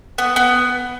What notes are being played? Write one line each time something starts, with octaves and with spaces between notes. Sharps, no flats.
B3
B3